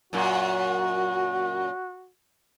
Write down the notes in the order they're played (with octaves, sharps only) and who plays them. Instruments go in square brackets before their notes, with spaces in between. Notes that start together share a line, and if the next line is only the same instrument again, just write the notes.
[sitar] F#2 A#2 [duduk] F#4